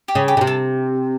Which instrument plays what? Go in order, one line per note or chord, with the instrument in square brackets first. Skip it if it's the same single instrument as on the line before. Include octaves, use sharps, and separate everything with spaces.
[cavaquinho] G4
[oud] C#3
[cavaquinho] G4
[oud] C#3
C3
[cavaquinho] A4